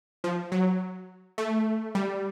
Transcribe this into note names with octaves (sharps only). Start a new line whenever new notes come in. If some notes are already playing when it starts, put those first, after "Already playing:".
F3
F#3
A3
G3